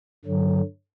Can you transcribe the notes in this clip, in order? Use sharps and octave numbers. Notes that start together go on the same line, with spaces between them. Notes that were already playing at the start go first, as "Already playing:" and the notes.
G2 D3 F#3